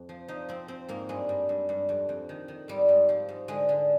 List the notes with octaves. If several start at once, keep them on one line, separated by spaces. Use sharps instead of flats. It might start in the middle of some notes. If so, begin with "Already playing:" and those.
Already playing: F2
F3
F3 D#4
F3 C4
F3 C4
G#2 A#3
G2 G#3
G2
G2
G2
F2
F2
D#3
D#3
G#2 G3
G#2
F3
G#2
D3 G#3
D3